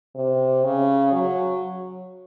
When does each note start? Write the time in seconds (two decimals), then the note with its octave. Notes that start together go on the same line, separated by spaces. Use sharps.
0.15 C3
0.64 C#3
1.12 F#3